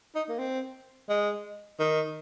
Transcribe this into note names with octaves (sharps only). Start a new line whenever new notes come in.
D#4
A#3
C4
G#3
D#3